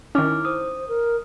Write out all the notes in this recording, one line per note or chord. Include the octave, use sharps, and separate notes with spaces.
D#3 C#4 E4 D6 F6
C5 D#6
A#4